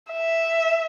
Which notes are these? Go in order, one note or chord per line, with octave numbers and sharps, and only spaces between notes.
E5